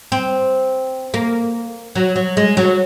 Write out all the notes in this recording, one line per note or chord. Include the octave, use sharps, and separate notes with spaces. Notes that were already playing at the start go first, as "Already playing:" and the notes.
C4
A#3
F#3
F#3
G#3
F#3